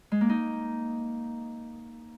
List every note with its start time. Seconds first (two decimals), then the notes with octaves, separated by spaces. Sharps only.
0.12 G#3
0.21 A#3
0.29 D#4